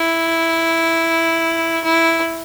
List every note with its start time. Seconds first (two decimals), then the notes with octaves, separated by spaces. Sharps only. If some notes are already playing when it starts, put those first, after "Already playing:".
Already playing: E4
1.84 E4